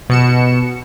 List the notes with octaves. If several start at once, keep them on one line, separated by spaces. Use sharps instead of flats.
B2 C#7 E7